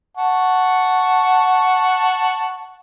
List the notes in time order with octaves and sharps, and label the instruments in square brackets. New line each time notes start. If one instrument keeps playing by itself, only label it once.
[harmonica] F#5 A5 C#6